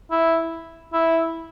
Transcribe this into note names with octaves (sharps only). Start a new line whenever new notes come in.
E4
E4